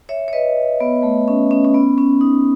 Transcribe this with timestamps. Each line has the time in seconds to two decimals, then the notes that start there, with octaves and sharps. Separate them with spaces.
0.09 C#5 E5
0.28 C#5
0.33 B4 D#5
0.80 B3
1.03 A3
1.28 C#4
1.51 C#4
1.64 C#4
1.74 B3
1.98 C#4
2.21 D#4